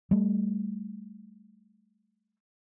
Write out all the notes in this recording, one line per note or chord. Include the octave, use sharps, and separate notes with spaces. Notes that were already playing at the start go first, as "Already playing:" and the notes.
G3 A3